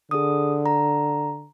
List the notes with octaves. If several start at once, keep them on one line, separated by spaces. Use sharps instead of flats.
D3 G#4 D#6
A#5